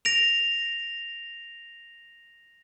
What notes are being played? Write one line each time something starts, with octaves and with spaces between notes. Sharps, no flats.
A#6 D7 F7